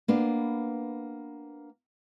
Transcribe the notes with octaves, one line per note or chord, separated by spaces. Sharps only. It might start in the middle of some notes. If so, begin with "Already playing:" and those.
A#3 B3 D4